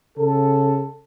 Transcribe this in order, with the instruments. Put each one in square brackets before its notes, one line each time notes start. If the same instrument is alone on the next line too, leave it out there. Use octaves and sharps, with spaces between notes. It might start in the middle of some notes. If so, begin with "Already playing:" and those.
[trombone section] C#3 A4